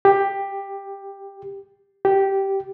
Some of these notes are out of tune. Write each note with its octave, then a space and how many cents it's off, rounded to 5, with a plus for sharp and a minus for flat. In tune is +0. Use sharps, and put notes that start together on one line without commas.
G4 +10
G4 -10